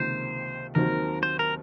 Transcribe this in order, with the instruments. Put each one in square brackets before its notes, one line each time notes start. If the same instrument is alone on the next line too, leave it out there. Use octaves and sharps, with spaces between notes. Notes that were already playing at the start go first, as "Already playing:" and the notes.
Already playing: [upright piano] C#2 C3 D#3 A#3 F4 [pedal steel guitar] C5
[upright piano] D#2 D#3 F#3 C4 [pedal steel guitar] A#4
[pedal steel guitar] C5
A#4